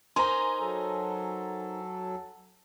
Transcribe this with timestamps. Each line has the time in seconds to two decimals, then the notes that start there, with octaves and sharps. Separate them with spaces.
0.16 D#4 A#4 C5 G#5 A#5 C6
0.59 F#3 A4